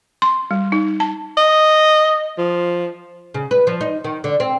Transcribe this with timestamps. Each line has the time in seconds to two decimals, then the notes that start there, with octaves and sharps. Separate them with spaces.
0.22 C6
0.51 G3
0.72 D#4
1.00 A5
1.37 D#5
2.38 F3
3.34 C#3
3.51 B4
3.67 F3
3.81 D#4
4.04 D#3
4.24 D3
4.40 C4